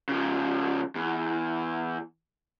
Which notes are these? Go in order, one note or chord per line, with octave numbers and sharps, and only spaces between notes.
C#3 F3
E2